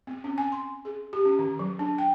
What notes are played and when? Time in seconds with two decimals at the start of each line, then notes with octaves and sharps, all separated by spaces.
0.07 C4
0.24 C#4
0.38 G#5
0.52 C6
0.85 G#4
1.13 G4
1.25 C#4
1.39 D#3
1.59 F#3
1.79 D4
1.98 G5